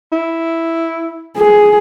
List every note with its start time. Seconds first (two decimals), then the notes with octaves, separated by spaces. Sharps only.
0.12 E4
1.37 G#4